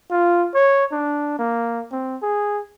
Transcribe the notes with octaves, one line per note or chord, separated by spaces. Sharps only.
F4
C#5
D4
A#3
C4
G#4